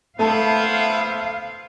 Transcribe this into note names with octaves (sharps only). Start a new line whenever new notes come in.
A3 B3 E4 C5 F5 A5